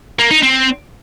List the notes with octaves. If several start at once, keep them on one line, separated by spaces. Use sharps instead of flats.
A#3
D#4
C4